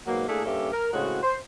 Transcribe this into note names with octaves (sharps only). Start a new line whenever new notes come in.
G#2 B2 F#3 A#3
A3 A#3 D4 E4 G#4
G2 A#3 C#4 G4 A4 E5
A#4
A2 C#3 G#3 C4 F#4
C5